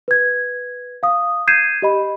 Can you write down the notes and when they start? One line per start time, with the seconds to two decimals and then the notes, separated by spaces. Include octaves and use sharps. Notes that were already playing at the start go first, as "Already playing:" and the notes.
0.08 B4 G#6
1.03 F5 D#6
1.47 G6 G#6 C7 D#7 E7
1.82 G4 D#5 B5